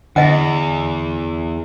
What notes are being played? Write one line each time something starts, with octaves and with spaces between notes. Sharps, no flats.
E2 D3 D#5 F#5